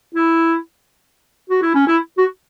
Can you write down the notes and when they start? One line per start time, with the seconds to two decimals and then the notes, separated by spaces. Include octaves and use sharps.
0.15 E4
1.50 F#4
1.63 E4
1.75 C#4
1.88 E4
2.18 F#4